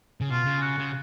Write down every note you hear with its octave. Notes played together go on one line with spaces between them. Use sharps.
C#3
B2 F4
C#3
F#4
C#3